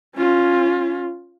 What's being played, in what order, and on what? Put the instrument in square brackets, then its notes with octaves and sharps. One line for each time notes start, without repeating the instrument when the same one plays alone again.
[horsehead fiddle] C#4 F4